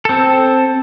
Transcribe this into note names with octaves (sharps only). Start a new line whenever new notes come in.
C4 A4